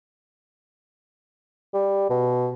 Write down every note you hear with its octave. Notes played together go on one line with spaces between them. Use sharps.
G3
B2